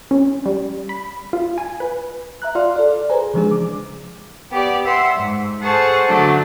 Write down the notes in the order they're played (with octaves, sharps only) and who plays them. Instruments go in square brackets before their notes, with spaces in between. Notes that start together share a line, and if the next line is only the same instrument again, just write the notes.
[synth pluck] C#4
G3
B5
F4
G#5
B4
[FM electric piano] E5 A#5 F#6
F4 D5 F5 C6 F6
A4 D5
G#4 B4 C5 G#5 A#5
C#3 E3 F3 G#3 D4 G#4
D6
[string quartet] B3 G4 D5
E5 F#5 C6
G#2
G#4 A4 C5 F#5 A5 C#6
D3 F#3 A3 D4